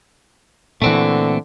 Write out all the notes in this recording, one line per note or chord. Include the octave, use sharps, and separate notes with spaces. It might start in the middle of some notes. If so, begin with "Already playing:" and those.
A#2 D3 E3 A3 C4 F#4